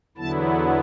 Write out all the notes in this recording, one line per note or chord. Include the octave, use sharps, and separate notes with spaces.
E2 D3 F#3 B3 E4 A5